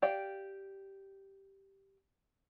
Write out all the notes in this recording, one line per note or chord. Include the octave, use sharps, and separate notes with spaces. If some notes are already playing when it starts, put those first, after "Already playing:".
G4 D5 F5 G5